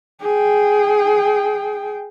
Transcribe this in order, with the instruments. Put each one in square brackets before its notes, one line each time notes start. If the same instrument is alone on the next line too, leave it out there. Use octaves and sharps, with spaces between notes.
[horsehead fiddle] G#4 G5